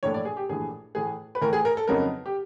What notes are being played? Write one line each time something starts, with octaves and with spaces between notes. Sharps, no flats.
A#1 A2 E3 A3 D4 C#5
D5
G#4
G4
A#1 A2 E3 A3 D4 G#4
A2 E3 A3 G#4
B4
A2 E3 A3 A#4
G#4
A#4
A4
F2 C#3 F#3 B3 D#4 A#4
G4